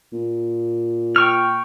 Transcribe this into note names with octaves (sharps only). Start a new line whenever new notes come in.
A#2
G5 C#6 F6